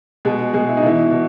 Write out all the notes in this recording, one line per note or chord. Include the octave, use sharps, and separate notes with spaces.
B2 G#3 G#4
B2 G#3 G#4
E4
D#4
B2 E3 E4
B2